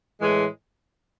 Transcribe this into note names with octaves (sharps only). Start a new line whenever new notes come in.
A2 E3 G#3